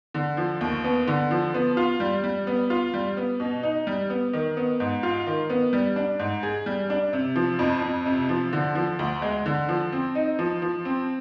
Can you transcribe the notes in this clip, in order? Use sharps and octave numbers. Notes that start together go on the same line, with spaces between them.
D3
F3
D#2
B3
D3
F3
B3
F4
G3
G3
B3
F4
G3
B3
B2
D#4
G3
B3
D#3
B3
G#2
F4
D#3
B3
G3
D4
G#2
G#4
G3
D4
C3
F3
F2
F2
C3
F3
D3
F3
D2
G#3
D3
F3
C4
D#4
F3
F3
C4